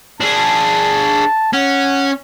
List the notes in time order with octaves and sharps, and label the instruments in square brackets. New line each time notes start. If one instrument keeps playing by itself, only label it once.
[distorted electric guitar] D4 G#4 [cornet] A5
[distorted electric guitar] C#4 [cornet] F#5